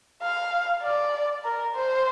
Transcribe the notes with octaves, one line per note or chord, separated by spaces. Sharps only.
F5
D5
A#4
C5